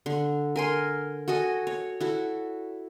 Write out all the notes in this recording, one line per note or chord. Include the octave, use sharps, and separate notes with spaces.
D3
A#4 G#5 C6
F#4 A4 D#5 G#5
C#5
E4 F#4 A4